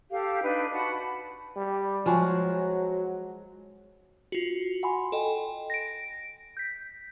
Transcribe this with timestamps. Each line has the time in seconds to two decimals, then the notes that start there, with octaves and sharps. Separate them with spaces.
0.10 G4 A4 F5
0.44 D4 D#4 B4
0.72 F#4 F#5 A5 B5
1.56 G3
2.06 F3 F#3 G#3 F#4
4.32 F4 F#4
4.83 F#5 G#5 B5 C6
5.12 A4 D#5 G5 G#5
5.70 A#6 D7
6.57 G6 B6